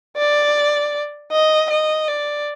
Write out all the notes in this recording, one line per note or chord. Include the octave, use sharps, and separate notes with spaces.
D5
D#5
D#5
D5